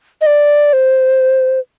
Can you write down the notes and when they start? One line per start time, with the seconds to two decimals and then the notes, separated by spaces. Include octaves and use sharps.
0.21 D#5
0.26 D5
0.73 C5